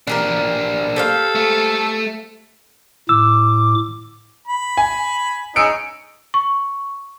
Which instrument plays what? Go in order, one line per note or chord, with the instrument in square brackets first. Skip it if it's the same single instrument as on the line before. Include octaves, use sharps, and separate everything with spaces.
[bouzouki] E3 G4 A#4 [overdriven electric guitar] A#3 D4
[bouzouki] G4 C5 F5 [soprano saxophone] A4
[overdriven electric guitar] A3
[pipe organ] A2 D6 [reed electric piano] E6
[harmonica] B5
[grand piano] G#5
[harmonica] C#4 D#4 G#4 [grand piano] E6 C#7 D7
[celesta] C#6